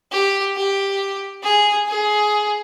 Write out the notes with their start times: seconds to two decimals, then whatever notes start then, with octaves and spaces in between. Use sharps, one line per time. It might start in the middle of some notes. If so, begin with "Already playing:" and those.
0.12 G4
0.56 G4
1.43 G#4
1.88 G#4